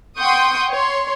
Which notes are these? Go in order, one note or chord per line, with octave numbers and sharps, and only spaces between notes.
F#5 G5 C6 C#6 D#6 G6
C#5 C6